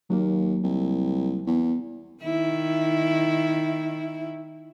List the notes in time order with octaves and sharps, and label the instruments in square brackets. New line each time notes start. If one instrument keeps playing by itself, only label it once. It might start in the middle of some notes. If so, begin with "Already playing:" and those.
[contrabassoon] D#2 [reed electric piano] F#3 A#3
[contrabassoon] C2
E2
[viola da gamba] D#3 E4